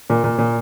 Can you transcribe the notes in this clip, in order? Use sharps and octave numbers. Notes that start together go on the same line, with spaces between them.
A#2
A#2
A#2